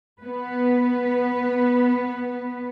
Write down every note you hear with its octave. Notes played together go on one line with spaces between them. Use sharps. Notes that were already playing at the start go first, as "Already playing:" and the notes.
B3 B4